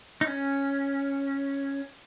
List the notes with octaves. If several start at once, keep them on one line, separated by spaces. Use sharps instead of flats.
D#4
C#4